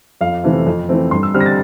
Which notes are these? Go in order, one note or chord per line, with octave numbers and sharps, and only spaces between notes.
F2 F5
C3 E3 A3 C4
F2
E3 A3 C4
G2 C6
E6
D3 G3 C4 F6
A#6
A6